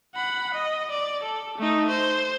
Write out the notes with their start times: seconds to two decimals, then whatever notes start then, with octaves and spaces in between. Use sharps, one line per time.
0.15 F#5 B5
0.54 D#5
0.91 D5
1.23 A4
1.58 A3 D#4
1.89 C5